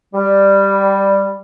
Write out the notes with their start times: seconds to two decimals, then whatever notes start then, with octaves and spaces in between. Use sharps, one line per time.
0.14 G3